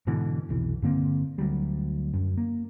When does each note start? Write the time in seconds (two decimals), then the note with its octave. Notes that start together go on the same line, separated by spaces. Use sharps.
0.07 G#2 B2 D3 E3
0.49 F1 B1 E3
0.82 G2 D3 A#3 C4
1.38 D2 F#3 G3
2.13 F#2
2.37 A#3